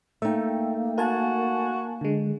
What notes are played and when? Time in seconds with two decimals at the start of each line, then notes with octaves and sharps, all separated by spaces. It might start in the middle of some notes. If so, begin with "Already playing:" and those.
0.22 A3 A#3 D#4 E5 G5
0.98 F#4 A#4 G#5 A5
2.01 D3 G#3